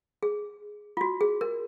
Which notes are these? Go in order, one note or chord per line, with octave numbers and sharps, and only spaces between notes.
G#4
F4
F#4
G#4
A#4